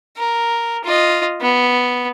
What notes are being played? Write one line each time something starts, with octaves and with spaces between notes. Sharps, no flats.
A#4
F4 D#5
B3